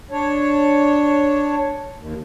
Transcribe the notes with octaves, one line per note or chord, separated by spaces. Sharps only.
D4 C#5
D#2